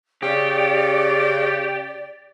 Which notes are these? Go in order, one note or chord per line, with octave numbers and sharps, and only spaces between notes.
C#3 G4 D5